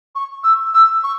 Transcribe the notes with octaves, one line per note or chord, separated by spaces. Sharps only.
C#6
E6
E6
C#6